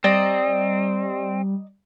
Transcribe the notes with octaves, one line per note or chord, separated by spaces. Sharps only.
G3 C4 D5 D#5 A#5